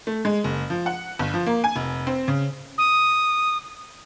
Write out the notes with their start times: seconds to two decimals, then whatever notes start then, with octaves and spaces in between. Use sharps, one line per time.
0.07 A3
0.25 G#3
0.44 F#1
0.70 F3
0.86 F#5
1.19 G1
1.34 F3
1.46 A#3
1.64 G#5
1.76 F1
2.07 C4
2.28 C#3
2.78 D#6